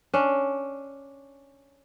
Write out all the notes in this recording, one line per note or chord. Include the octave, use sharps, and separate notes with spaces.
C#4 D4